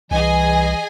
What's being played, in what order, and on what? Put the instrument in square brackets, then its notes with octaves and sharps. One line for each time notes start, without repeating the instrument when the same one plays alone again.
[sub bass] C2 [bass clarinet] E3 [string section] G#4 D#5 G#5